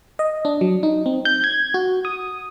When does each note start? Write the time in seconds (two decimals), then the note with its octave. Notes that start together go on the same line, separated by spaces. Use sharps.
0.19 D#5
0.45 D4
0.61 F#3
0.83 D#4
1.06 C4
1.25 G6
1.44 G#6
1.74 F#4
2.05 D#6